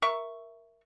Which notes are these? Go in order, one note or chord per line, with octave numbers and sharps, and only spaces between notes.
A#4 E5 C#6